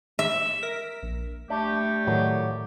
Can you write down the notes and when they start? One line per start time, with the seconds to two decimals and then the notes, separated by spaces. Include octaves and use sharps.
0.19 E5
0.63 A#4 B6
1.03 A#1
1.50 G3 A3 D4 G4
2.07 A2 D#3 F#3